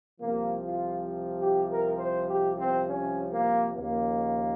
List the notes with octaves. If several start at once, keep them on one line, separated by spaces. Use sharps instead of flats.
C2 C3 F3 A#3
F4
G4
A#4
C5
G4
C4
C#4
A#3
D#2 C#3 F3 A#3